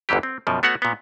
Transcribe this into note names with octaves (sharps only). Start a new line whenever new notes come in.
G1 E2 G#2 E3 G4
C4
F#2 B2 F3
A3 B3 F#4 C#5 F#5
A#2 B3